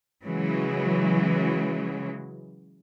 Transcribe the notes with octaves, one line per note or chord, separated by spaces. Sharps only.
C#3 E3 F#3 G#3